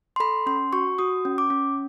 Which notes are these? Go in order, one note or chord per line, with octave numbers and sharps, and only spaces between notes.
C6
A4 B5
C#4 C6
F#4 C#6
F#4 D#6
C#4
D6
C#4